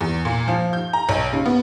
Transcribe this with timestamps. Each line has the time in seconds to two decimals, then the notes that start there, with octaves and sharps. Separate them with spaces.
0.01 E2
0.25 A#2
0.48 F3
0.73 G6
0.93 A#5
1.09 B1
1.33 C#3
1.46 B3